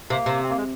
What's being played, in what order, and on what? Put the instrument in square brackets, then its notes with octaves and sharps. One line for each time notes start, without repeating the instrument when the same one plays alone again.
[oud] C3 [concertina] A#3
[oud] C3
[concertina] C4
A#3
G#3